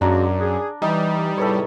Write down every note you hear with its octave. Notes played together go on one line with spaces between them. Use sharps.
F#2 G#3 A#3 D4 F#4 D5 A#5
G#4
E3 G3 D#4
E2 A2 C3 A4 B4 C#5